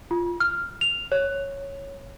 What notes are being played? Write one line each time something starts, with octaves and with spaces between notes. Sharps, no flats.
F4
F6
F7
C#5